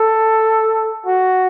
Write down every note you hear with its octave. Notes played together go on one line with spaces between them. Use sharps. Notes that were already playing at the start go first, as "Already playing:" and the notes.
Already playing: A4
F#4